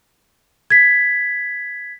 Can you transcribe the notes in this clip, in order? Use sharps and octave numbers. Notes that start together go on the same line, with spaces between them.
G#6 B6